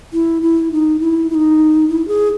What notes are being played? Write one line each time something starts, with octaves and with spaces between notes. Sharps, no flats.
E4
E4
D#4
E4
E4
D#4
E4
G#4